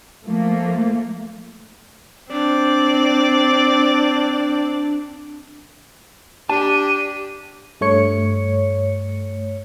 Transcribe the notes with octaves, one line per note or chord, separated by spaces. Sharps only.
F3 A3 A#3
C4 D4 D5
D4 G4 A5 D#7
G2 A3 C#5 C#7